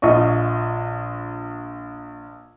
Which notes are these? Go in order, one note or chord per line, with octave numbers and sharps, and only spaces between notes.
A#1 F4 D#5 C#6